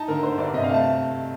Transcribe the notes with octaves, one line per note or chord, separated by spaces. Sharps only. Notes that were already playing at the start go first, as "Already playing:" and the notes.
Already playing: D#4 A5
D3 A#4
D3 C5
G2 D5
C3 D#5
F5
A3
A5